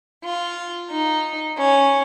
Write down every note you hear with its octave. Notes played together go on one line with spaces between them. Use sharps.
F4
D#4
C#4